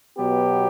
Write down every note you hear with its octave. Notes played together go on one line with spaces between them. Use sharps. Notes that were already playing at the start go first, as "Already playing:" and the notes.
B2 F#3 B3 G4